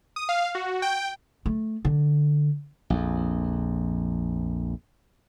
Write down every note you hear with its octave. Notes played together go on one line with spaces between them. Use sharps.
D#6
F5
F#4
G5
A3
D3
A#1 F2